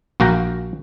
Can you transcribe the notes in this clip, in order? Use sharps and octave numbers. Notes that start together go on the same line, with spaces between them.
A#1 A#3 F#4 F5 G5 A#5